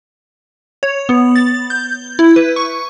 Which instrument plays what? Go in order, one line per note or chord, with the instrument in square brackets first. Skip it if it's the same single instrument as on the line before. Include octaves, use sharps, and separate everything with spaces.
[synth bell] C#5
B3
A6
G6
E4
B4
C#6